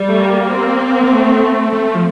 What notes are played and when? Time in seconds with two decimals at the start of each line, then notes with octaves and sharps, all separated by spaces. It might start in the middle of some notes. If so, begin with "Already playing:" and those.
Already playing: G3
0.09 A3
0.20 A#3
0.51 C4
1.04 A#3
1.12 A3
1.73 A3
1.95 F3